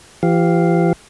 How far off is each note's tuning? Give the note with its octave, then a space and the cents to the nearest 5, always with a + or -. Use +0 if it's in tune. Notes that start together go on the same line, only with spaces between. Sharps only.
E3 +45 G4 +0 F5 +0